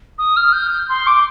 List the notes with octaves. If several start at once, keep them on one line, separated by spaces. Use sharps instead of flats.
D#6
F6
G6
G6
C6
D6